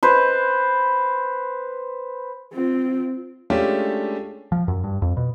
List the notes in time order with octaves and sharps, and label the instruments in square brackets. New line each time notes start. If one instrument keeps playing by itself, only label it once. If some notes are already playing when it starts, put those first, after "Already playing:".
[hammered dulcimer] B4 C5
[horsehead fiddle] C4 F4
[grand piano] G#3 A3 C#4 D4 F4 G4
[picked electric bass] F3
F#2
G2
F2
B2